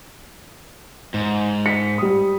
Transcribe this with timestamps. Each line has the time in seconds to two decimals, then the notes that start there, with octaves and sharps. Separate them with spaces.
1.14 G#2
1.66 B6 C#7
1.98 G3 D#6